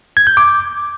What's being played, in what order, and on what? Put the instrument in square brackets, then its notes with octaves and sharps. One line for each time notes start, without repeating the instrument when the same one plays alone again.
[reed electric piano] G#6
G6
D6